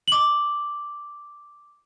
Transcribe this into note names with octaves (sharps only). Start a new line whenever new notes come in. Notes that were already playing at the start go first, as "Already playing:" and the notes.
D6 F#7